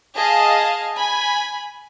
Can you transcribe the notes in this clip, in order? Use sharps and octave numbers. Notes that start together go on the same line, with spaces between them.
G#4 D#5 F5 A5
G#5 B5